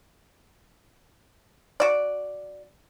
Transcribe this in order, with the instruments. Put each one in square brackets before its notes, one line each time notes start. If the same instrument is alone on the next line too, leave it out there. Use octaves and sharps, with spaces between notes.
[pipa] F#4 D5